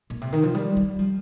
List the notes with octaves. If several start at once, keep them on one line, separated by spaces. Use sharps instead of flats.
A#2
C3
D#3
F3
G3
G3
F3